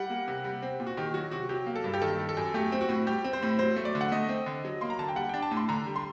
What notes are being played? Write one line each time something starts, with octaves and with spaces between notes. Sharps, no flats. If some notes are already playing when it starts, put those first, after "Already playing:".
Already playing: G3 F#5
A#3
C3
G3
C4
A#2
F#4
D#3 G4
F#3 F#4
C3 F#4
F#3 G4
A#3
A4
G2
G4
D#3 A4
G3
A4
F#2
A3 G4
C4
F#4
A2
G3 G4
C4
C5
A2
F#3 C5
A3
D5
D3
F#5
A3 D#5
C4
D3
F#3
A#3 C6
A#5
D3 A5
G5
G3 F#5
G5
D4
A5
A2
C6
D3 A#5
G3
C6